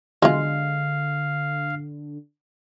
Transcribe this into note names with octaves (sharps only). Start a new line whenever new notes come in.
B1 D3 E3 G#3 F4 F5